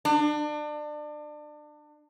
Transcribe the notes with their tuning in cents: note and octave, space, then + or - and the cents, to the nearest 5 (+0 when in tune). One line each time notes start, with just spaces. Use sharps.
D4 +30